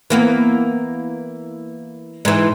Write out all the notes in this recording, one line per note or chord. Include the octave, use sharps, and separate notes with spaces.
E3 A#3 B3
G#2 E3